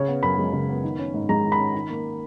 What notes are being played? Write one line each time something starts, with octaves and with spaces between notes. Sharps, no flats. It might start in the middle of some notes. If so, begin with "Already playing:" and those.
Already playing: C#3 C#5
B3
F#2 B5
G#3
C#3
B3
D#3
C#4
G#2
G#3 A#5
D#3
B5
C#4
D#3
A#3